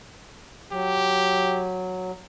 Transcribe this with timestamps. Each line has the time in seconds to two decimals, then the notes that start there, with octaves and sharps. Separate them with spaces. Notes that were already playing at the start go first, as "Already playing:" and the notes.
0.72 F#3 G4